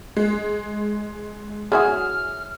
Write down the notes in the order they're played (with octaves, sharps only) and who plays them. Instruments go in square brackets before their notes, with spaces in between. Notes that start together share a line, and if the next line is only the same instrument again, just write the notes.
[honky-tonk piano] G#3
[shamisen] F#3 E4 F#4 [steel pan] G#4 [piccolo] F6